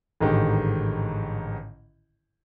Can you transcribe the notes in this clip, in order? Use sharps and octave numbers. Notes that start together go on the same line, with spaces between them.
A1 G#2 D3 D#3 G4